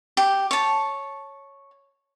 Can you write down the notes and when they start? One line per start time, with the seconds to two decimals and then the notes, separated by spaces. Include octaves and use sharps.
0.17 G4
0.51 C#5 A5